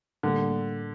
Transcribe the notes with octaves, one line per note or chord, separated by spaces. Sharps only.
A2 D3 G3 A#3